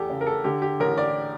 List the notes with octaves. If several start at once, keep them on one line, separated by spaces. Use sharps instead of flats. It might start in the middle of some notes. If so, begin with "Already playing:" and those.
Already playing: E2 G4 A4
C#3
A#4
A4
D3 G4
G4
A1 A#4
D5